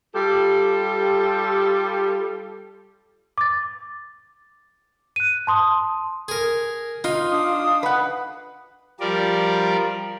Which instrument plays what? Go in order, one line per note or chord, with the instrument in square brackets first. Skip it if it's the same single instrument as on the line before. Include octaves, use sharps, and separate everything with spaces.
[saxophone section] G3 F4 G4 A4
[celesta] D6 A6
F#6 D#7
A5 C6 D#6
[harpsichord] G#4 A#4
[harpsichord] D#4 [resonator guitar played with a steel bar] F4
[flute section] D4 F5 D#6
[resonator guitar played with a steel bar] B4 F#5
[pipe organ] F3 G3 A#4 D5